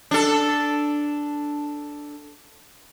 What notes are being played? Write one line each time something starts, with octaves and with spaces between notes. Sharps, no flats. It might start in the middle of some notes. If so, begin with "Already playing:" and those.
D4 A4